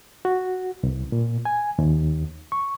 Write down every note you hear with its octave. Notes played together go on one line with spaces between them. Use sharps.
F#4
C2
A#2
G#5
D#2
C#6